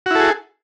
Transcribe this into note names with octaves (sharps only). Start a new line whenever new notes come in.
E4 F#4 G#4 A4